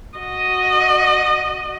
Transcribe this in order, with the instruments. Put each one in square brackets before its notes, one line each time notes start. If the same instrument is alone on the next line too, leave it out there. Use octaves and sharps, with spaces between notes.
[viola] F#4 D#5